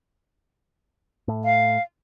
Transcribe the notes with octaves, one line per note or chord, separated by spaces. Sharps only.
A2
F5